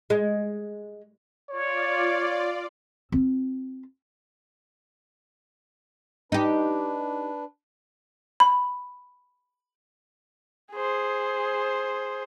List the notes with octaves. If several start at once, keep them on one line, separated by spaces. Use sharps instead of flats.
G#3
F4 C#5 D5
C4 F4
D4 D#4 G4 B4
B5
G#4 C5